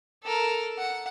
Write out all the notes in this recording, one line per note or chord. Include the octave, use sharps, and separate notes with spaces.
A4 A#4
F#5